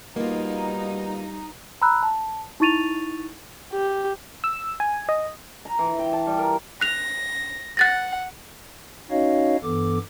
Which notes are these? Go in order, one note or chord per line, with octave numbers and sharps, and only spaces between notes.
B2 G3 A#3 D#4 F4
A#5 B5 E6 F#6
A5
D#4 E4 C#6 A6 D#7 F7
G4
E6
G#5
D#5
A#5
E3
G5
A5
G3
A#4
F#6 A#6 F7
F#5 F#6 A6 A#6
C#4 D#4 F#4 C#5 D#5 F5
G2 E3 B3 A4 D6